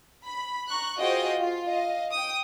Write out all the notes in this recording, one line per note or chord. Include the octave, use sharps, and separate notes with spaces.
B5
A#5 C#6 F#6
F4 F#4 G#4 C5 D#5 G5
F4
D#5 F5
G5 D#6